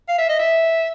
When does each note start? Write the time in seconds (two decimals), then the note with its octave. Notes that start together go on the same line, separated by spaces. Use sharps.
0.08 F5
0.18 E5
0.29 D#5
0.39 E5